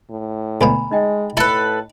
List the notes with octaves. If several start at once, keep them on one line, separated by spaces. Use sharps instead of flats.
A2
D2 B2 F5 G#5 A#5 B5
G#3 D#4 D#5 G5
A2 E4 A4 B4